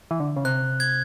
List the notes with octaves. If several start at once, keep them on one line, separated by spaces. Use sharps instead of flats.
E3
D3
C#3
C3 F#6
G#6